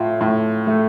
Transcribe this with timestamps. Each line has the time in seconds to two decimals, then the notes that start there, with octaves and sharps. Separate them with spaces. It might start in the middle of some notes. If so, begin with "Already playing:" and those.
Already playing: A2 F4
0.21 A2
0.67 A3